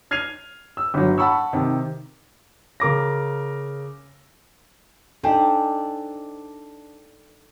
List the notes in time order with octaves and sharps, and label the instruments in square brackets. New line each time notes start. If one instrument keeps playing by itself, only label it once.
[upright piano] F6 G#6 C7 D#7 F7
E6
G1 F#3
F#5 A5 B5 C#6 E6
C3 D#3
[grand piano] C#3 A#4 D6 A#6
[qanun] D4 [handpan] D#4 A4 [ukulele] G4 C5 G#5